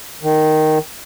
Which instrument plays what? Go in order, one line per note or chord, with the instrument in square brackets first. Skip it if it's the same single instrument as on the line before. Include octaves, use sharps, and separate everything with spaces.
[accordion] D#3